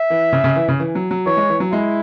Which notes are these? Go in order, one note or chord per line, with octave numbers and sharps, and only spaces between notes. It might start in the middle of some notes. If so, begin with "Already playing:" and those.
Already playing: E5
E3
C#3
C#3
E3
C#3
E3
F#3
F#3
E3 C#5
G#3
E3
F#3
G#3 E4